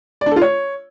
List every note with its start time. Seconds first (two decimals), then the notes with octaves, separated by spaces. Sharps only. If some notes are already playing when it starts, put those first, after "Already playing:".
0.21 D5
0.26 D4
0.31 A4
0.36 F4
0.41 C#5